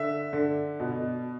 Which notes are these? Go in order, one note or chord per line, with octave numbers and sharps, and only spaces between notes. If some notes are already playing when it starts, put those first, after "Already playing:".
Already playing: D3 E5
D3
B2